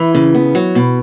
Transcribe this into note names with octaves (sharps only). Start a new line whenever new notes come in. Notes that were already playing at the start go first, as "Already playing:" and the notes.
Already playing: E3
C#3
B3
F#3
B2